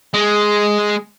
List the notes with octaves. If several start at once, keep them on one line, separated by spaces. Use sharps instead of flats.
G#3